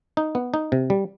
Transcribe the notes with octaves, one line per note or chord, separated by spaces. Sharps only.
D#4
B3
D#4
C3
G3